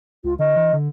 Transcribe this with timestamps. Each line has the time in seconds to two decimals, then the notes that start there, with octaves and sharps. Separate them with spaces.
0.24 C#2 F4
0.39 D3 D#5
0.56 E3
0.73 D3